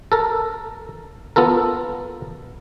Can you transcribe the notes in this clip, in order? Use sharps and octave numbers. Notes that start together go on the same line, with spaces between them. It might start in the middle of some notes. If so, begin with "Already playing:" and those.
A4 A#4
B3 F4 A4 A#4